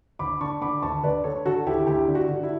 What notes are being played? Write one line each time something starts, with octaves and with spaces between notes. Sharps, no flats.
D2 B5 D6
D3 A5 C#6
D3 B5 D6
D2 A5 C#6
D2 B4 D5
D3 A4 C#5
D3 F#4 A4
D2 E4 G4
D2 E4 G4
D3
F#4
D3
E4